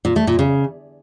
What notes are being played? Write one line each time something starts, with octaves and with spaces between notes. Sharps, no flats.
A#2
A3
A#2
C#3